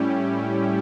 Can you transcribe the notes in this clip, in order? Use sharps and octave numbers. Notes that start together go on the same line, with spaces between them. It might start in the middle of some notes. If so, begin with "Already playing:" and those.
Already playing: A2 G3 C#4 E4 G4